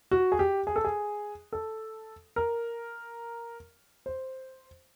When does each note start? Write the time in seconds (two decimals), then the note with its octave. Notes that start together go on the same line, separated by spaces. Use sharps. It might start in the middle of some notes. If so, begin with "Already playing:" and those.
0.11 F#4
0.32 G#4
0.39 G4
0.67 G#4
0.76 A4
0.85 G#4
1.52 A4
2.36 A#4
4.06 C5